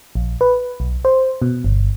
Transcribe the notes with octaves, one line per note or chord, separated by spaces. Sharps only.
A#1
B4
B1
C5
B2
G1